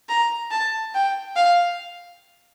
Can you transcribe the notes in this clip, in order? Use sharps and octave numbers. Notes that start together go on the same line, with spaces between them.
A#5
A5
G5
F5